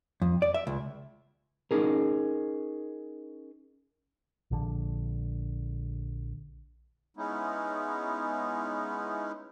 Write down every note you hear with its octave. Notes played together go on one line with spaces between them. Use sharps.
F2
D5
E5
C#2
C#4 D#4 G#4 A#4
A#1 D3
G#3 B3 C#4 D#4 E4